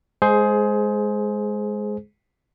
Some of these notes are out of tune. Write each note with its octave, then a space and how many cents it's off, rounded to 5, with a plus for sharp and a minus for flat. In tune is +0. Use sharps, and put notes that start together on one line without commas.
G#3 +0 G#4 +20 C5 +0